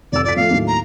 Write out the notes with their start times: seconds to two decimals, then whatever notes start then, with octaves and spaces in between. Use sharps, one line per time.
0.12 F1 D5 E6
0.24 F2 D5 B6
0.37 F3 A3 F5
0.50 D#2 A2 F#3
0.67 A#5